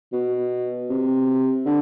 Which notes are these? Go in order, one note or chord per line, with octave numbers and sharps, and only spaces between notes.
B2
C3
D3